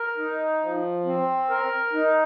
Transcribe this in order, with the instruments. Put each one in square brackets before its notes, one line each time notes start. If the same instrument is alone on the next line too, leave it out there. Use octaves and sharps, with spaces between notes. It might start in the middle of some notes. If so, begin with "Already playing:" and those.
Already playing: [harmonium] A#4
D#4
F3
C4
A#4
D#4